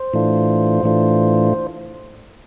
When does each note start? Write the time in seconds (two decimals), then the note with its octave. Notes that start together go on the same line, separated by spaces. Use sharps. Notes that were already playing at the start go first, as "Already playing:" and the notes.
Already playing: C5
0.13 A2 E3 A3 D4 F4
0.83 A2 E3 A3 D4 F4